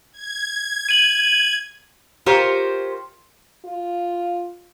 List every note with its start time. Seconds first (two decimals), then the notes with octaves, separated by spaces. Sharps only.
0.13 G#6
0.89 D#7 F#7
2.26 F4 G4 A#4 C5 C#5
3.65 F4